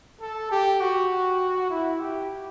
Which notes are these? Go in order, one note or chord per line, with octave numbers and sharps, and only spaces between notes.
A4
G4
F#4
E4
G4